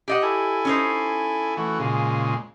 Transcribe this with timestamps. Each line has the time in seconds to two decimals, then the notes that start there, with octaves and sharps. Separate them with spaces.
0.08 G4 D#5 F#5
0.22 E4 A4 G#5
0.65 C#4 D#4 C5
1.57 E3 A3 F#4
1.79 A#2 C#3 G#3